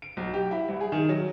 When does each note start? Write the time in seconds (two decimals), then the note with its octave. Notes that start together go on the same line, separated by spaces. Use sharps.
0.02 D7
0.17 B1
0.34 G4
0.51 E4
0.69 C2
0.81 G#4
0.92 D#3
1.09 F#3